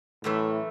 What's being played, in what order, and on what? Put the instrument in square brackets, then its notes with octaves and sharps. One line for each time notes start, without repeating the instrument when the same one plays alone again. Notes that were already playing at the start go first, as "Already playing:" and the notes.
[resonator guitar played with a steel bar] F#2 E3 A3 [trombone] A2